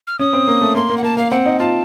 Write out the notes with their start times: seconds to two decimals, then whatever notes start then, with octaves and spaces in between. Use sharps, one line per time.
0.07 F6
0.19 C#4 D#6
0.33 C4
0.47 A#3
0.61 A3
0.75 A#3 C6
0.90 A#3
0.97 F#5
1.03 A#3 A5
1.17 A#3 F5
1.31 C4 F#5
1.46 D#4
1.59 F4 A5